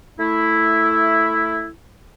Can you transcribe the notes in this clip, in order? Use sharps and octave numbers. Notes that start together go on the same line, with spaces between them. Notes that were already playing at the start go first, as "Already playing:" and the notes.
A3 E4